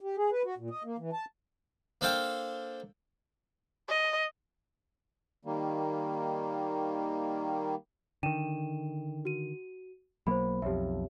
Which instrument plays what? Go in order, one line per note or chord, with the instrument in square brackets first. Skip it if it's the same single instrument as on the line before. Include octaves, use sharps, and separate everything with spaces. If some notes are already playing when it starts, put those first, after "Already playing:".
[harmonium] G4
G#4
B4
F#4
A#2
D#5
A#3
E3
A5
[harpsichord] A#3 D4 A4 C5 F5 G5
[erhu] D#5
[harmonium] D#3 G3 A#3
[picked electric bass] D3 D#3 [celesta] G5 D#7 E7
[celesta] F#4 D#7
[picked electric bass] B1 F#3 A#3 [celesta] C5 B5
[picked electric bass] B1 F2 [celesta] G4 C#5 E5